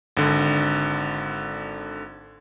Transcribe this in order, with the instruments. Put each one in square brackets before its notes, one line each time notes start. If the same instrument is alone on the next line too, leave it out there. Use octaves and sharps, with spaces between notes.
[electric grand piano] G#1 D3